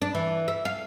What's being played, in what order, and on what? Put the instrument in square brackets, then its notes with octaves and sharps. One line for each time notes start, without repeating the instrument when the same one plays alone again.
[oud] D4
E3
E5
F5